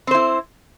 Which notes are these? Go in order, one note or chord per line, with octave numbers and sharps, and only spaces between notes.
C4 E4 C5